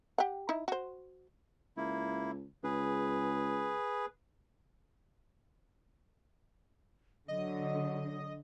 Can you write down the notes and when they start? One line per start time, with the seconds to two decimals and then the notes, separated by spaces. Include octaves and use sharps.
0.18 G4 F#5
0.49 D#4 E4
0.68 F#4 C5
1.77 C#2 A#3 E4
2.64 C#2 G#4 B4
7.28 D3 F#3 D#5